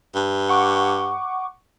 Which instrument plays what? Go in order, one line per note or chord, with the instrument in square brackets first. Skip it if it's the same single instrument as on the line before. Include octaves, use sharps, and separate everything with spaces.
[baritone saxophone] G2
[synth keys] F#5 C#6 D6